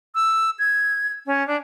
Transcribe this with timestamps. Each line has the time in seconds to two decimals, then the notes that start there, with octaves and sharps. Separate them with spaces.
0.15 E6
0.59 G#6
1.26 C#4
1.47 D4